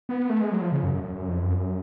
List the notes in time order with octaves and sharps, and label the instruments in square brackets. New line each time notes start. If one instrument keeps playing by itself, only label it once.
[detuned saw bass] B3
A3
G#3
F#3
F3
C#3
F#2
F#2
F#2
F#2
F2
F#2